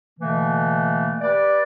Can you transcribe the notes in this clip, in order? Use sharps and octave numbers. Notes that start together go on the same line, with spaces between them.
B2 D3 E3 A3 A#3
G4 B4 D5